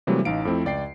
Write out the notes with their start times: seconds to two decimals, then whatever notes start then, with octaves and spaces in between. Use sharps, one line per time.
0.07 C3 E3 F#3 G3 A3 A#3
0.25 A1 D#4 F5 D7
0.45 F2 A3 C4 E4
0.65 C#2 D5 G5 C7